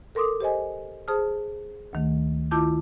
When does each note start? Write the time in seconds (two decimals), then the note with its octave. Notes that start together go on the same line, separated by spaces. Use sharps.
0.15 A4 A#4 C6 D6 D#6
0.41 G4 C5 D#5 G#5
1.08 G#4 C5 A5 D#6 F6
1.93 D2 D#3 A3
2.51 D#3 E4 F4 A5 D6 G6